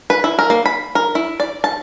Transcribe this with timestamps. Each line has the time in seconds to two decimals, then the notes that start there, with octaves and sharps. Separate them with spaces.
0.10 B4
0.24 E4
0.39 A#4
0.50 A#3
0.66 B5
0.95 A#4
1.15 E4
1.40 D5
1.64 A5